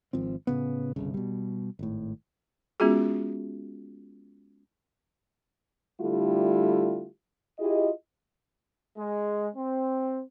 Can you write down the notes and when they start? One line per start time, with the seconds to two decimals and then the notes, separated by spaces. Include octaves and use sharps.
0.13 G#1 F3 C4
0.47 A2 C#3 B3
0.96 G1 C2 C#3
1.14 B2 G3
1.79 G#1 A2
2.80 G#3 B3 C#4 F4 F#4 G#4
6.01 D3 G3 A3 E4 F4 G4
7.59 E4 F4 G4 G#4 D#5
8.96 G#3
9.55 C4